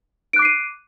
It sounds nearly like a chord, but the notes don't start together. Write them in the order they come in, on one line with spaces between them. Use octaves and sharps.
D7 F#6 D6 C7 D#7